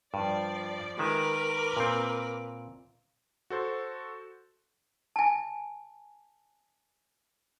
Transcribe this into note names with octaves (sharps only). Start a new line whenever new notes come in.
G2 F3 D5
D#3 G#3 A#4 B4 E5 D6
A#2 C4
F#4 A4 C5
G#5 A5